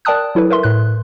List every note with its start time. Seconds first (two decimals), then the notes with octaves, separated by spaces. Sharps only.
0.05 A#4 D5 G5 A5 D#6 F#6
0.35 F#3 E4 A4 B4
0.50 A#4 B4 E5 C6
0.63 A2 F#6